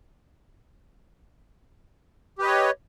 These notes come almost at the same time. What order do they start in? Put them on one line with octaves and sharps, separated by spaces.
G4 B4 D#5 C#5